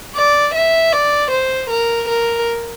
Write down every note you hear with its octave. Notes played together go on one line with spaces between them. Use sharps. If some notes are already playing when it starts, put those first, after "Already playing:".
D5
E5
D5
C5
A#4
A#4